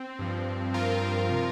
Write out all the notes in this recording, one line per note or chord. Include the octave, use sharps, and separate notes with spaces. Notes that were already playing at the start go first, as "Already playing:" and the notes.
Already playing: C4
G2 F3
G2 F3 F4 A#4
C3 F3